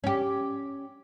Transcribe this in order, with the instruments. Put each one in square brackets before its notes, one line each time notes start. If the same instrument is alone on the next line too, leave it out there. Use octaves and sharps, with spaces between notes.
[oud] C#4 G4